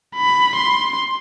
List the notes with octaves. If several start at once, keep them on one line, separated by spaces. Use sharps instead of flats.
B5
C6